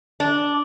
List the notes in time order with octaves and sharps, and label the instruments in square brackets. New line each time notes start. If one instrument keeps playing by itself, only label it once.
[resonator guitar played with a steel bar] D4